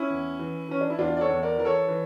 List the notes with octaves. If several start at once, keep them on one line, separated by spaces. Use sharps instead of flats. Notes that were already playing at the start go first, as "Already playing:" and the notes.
Already playing: C#4 E4
E2
E3
E3 C#4
D4
E4
E2 D4 F4
D5
A4 C#5
E2
A#4 D5
E3 A#4
A4 C#5
E3